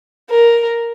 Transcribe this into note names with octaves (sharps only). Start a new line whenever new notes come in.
A#4